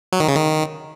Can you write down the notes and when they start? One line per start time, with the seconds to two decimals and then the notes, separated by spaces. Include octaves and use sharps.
0.13 F#3
0.20 D#3
0.28 C#3
0.35 D#3